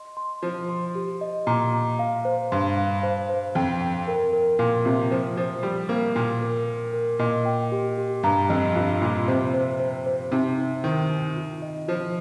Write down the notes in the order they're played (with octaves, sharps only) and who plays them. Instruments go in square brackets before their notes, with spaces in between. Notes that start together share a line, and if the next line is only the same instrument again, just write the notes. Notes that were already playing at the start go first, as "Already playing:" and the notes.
Already playing: [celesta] D#5 C6
C6
[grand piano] F3 [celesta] F4
[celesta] C6
G4
D#5
[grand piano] A#2 [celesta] A#5
[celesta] A#5
F5
C5
[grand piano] G2 [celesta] C6
[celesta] F5
C5
C5
[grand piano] F2 [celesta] G5
[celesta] G5
A#4
A#4
[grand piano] A#2 [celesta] F5
[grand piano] C3 [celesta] F4
[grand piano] F3 [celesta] C5
[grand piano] F3 [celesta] C5
[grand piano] G3 [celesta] C5
[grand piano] A#3 [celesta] C5
[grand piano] A#2 [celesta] G5
[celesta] A#4
A#4
A#4
[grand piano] A#2 [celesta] D#5
[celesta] G5
G4
G4
[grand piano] G2 [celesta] A#5
[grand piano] F2 [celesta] D#5
[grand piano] G2 [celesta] F4
[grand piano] A#2 [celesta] F4
[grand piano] C3 [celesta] C5
[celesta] C5
C5
C5
[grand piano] C3 [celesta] D#4
[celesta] D#4
[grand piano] D#3 [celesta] C5
[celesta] D#4
F4
D#5
[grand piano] F3 [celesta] F4